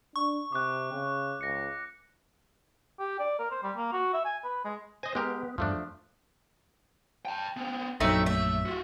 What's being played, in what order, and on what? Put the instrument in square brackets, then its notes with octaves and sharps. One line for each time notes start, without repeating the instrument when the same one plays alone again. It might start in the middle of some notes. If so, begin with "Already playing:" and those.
[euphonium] D4 [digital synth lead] C#6
[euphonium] C3 [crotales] D6 F#6
[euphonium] C#3
[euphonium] C#2 [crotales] A#6 C#7
[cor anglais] G4
D5
A#4
C5
G3
A#3
F#4
E5
G#5
B4
G#3
[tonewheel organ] C5 A#6 [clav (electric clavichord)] D#5 G#5
[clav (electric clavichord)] G#3 G4 A#4 [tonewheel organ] B3
[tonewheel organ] E2 G2 [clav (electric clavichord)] F3 A3 D4
[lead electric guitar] G5 A5
B3 C4
[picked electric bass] A#1 F#2 F#3 [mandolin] A3 D#4 E5 [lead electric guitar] C4
[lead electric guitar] A3 [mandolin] E5
[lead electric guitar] F4 F#4